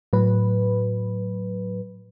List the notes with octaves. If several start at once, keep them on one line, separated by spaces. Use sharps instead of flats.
A2 F#3 B4